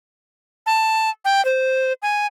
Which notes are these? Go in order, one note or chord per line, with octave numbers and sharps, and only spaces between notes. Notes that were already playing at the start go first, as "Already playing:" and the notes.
A5
G5
C5
G#5